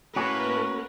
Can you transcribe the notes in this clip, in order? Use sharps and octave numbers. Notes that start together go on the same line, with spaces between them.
A2 A#3 C#4 F#4 A#4 B4